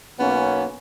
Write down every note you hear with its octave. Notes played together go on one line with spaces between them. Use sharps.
B1 A#3 B3 C#4